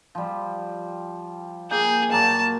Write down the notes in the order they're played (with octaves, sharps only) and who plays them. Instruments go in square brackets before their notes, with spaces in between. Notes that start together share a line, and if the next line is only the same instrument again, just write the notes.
[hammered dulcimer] F3 G3
[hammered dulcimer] A#3 G5 G#5 [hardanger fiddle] G#4
[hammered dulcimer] A#2 F#3 A#3 [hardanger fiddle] A5